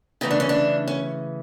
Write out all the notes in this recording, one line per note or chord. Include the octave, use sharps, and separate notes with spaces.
C#3 E3 A3 D#4
D4
C#4
D4
C#4